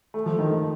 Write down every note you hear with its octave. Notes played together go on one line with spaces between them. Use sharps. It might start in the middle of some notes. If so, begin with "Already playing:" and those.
A3
F3
D#3
D#3